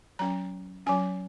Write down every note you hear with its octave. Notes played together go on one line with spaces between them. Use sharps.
F#3 C#4 A#5
F#3 C#4 G#5